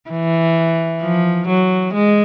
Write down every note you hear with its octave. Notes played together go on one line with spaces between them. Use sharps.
E3
F3
F#3
G#3